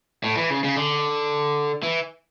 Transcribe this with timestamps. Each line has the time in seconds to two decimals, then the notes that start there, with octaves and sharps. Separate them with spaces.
0.24 A2
0.37 E3
0.50 C#3
0.64 C#3
0.76 D3
1.83 E3